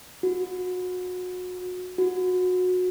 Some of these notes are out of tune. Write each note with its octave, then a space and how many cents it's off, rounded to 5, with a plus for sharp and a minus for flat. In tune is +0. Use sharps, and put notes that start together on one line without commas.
F#4 -30
F#4 -25